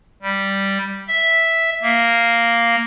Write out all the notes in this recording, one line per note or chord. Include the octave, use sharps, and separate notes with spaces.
G3
E5
A#3